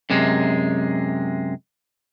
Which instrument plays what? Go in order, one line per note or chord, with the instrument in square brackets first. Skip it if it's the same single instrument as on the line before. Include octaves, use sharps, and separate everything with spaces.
[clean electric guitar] F#2 C3 G#3